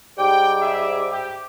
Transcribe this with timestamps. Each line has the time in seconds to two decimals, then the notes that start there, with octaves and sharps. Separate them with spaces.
0.18 G#2 G3 G5 D6
0.61 G#4 E5
1.11 G4